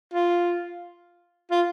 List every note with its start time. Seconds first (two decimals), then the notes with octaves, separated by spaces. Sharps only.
0.14 F4
1.51 F4